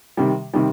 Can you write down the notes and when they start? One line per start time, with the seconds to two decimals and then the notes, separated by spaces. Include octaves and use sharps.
0.17 C3 D#3 G3
0.54 C3 D#3 G3